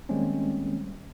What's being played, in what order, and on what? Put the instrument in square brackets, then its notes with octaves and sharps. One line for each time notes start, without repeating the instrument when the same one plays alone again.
[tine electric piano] D#3 G3 G#3 A#3 C4 C#4